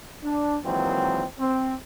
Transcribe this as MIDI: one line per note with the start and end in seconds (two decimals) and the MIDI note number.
0.24 0.57 62
0.64 1.23 46
0.64 1.23 51
0.64 1.23 52
0.64 1.23 54
0.64 1.23 56
0.64 1.23 60
1.39 1.74 60